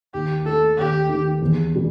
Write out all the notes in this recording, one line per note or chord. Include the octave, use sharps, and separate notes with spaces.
D#2 G4
D#3 A3 D#4 A4
D#2 G4
D#3 A3 D#4
E2
B2 G3